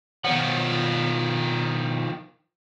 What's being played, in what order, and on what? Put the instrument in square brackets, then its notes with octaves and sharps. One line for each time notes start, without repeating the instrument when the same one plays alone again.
[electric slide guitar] B2 C#5 F#5 [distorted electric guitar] D#3 F3